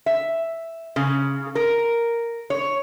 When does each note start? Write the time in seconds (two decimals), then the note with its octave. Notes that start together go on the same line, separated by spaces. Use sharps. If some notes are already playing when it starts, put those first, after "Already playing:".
0.06 E5
0.96 C#3
1.55 A#4
2.50 C#5